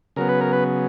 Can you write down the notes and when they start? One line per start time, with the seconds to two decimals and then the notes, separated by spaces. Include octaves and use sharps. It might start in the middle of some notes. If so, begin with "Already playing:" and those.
0.16 C#3 F#3 B3 A#4
0.29 B4
0.41 A#4
0.53 B4